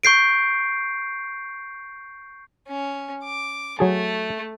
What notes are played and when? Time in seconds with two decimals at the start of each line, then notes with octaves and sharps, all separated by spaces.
0.03 C#6 G6 C7 D7
2.68 C#4
3.24 D6
3.79 F#3 A3 G#4 A5